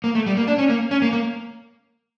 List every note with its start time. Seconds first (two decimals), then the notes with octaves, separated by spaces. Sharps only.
0.04 A#3
0.15 A3
0.27 G3
0.37 A#3
0.48 D4
0.58 C#4
0.70 A#3
0.91 C#4
1.02 A#3
1.13 A#3